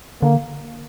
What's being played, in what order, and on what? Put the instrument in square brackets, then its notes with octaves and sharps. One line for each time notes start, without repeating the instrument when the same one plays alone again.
[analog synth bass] D3 [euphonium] A#3